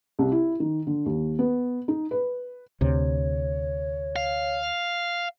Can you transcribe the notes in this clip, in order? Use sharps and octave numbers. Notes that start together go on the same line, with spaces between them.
C2
E4
D#3
D3
D#2
B3
D#4
B4
D2 C3 C#5
F5